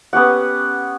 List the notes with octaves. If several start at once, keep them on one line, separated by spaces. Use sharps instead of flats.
B3 C#4 G4 F#5